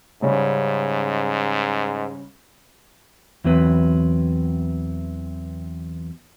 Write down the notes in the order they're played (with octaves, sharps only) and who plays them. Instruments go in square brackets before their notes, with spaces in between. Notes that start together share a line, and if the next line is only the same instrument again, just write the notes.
[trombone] G#2 [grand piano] C#3 G3 C#4
[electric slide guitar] E2 F#3 C4 B4